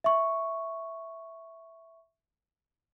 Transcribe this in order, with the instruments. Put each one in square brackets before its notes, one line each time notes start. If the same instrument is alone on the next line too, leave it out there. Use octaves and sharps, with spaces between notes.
[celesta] E5 C#6